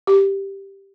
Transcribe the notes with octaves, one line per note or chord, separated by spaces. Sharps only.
G4